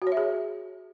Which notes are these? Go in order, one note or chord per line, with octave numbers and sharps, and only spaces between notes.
F#4
C#5
E5
G#4